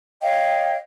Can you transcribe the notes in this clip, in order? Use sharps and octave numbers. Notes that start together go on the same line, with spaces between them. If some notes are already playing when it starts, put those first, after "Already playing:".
C#5 D#5 F5 G5